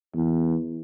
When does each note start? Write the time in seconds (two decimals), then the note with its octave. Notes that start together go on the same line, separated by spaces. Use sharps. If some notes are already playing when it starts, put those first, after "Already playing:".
0.15 E2